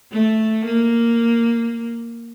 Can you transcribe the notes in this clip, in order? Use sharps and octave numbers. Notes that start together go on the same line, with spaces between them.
A3
A#3